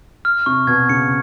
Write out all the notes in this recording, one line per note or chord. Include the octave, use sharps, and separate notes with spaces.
F6
C3 C#6
B2 G#6
C#3 C#7